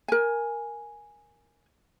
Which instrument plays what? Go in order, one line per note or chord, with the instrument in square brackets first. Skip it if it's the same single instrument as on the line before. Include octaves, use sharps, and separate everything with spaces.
[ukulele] A#4 G#5